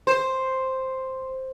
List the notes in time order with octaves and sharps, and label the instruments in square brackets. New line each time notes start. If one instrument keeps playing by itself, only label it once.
[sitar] C5